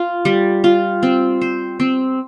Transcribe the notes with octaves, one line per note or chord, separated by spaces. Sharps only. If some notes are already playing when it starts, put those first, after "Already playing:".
Already playing: F4
G3
F4
C4
C5
C4